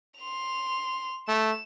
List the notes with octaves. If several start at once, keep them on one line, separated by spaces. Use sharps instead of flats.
C6 F7
A3 E7